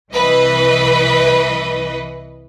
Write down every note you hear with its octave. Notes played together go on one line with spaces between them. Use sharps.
C2 E3 B4 D#5